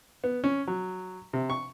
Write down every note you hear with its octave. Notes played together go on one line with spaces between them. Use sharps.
B3
C#4
F#3
C3
C#6